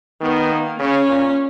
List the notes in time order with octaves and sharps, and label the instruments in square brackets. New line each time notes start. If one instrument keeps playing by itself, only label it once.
[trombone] D#3 [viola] B3
[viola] A#3
[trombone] C#3 [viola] C#4
[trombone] A#2